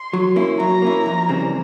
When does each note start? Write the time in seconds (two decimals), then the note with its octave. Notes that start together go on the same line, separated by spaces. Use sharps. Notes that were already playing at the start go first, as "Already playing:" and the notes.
Already playing: C6
0.13 F#3
0.36 A#3 C#4 E4
0.59 F#3 A#5
0.82 A#3 C#4 E4
1.06 F2
1.29 C#3 E3 G3 C4